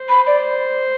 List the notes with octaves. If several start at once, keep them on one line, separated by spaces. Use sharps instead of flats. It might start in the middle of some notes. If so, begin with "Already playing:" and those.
Already playing: C5
B5
D5